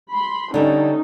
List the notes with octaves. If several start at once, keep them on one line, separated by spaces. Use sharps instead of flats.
B5 C6
D3 G3 C#4 D#4